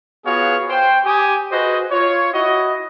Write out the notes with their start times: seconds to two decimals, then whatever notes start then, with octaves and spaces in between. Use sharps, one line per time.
0.25 B3 F4 F#4 G#4 C#5 F5
0.69 C5 G5
1.04 G4 G#5 D#6
1.51 F#4 G#4 B4 C5 D#5
1.91 F4 C#5
2.33 E4 F#4 D#5